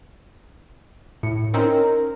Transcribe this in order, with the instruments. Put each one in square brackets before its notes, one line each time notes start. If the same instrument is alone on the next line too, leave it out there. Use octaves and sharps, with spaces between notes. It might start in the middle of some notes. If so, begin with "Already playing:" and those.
[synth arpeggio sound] A2 C#7
[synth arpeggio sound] C4 C#4 D#4 [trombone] A#4